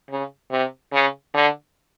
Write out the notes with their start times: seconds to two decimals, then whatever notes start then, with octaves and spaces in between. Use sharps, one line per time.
0.09 C#3
0.51 C3
0.93 C#3
1.34 D3